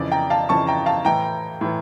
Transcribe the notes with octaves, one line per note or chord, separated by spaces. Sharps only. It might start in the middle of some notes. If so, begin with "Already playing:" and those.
Already playing: F2 C#3 E3 D5
G5 A#5
F5 A5
F2 C#3 E3 A5 C#6
G5 A#5
F5 A5
A2 E3 G5 A#5
A2 E3